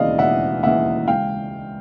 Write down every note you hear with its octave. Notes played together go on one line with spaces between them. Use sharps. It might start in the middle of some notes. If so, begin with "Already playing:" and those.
Already playing: E1 D#2 C#3 E3 D5 D#5 F5
E1 E5 F#5
D#2 C#3 E3 E5 F#5
C#2 F5 G5